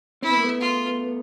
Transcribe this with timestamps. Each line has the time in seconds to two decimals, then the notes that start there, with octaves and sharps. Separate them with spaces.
0.22 C4 E4
0.31 B3
0.37 A#3
0.44 A3 B3
0.61 F4